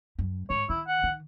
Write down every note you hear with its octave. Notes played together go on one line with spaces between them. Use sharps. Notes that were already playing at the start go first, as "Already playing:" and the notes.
F#2
G#2 C#5
D#3 E4
F#5
D#3